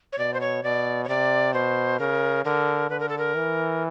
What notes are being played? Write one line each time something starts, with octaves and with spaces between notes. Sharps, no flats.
C#5
B2 D5
C5
C#5
B2 D5
C#5
C3 D5
B2 C5
C#3 A#4
D3 A#4
D3 B4
A#4
A4
A#4
E3